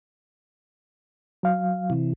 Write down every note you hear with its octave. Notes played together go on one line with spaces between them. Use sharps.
F#3 F5
C3 E3